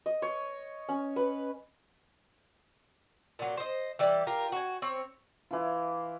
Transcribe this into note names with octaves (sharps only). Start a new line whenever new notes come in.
D#5
C#5
C#4
B4
A#2 F#3
C5 D#5
E3 G3 D5
F4 G4 A#4
F#4 G#5
C4 C#5
E3 F4